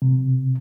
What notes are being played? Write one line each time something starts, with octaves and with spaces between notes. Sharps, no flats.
C3